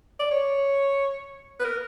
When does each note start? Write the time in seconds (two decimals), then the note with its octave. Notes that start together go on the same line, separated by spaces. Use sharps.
0.20 D5
0.31 C#5
1.59 B4
1.64 A#4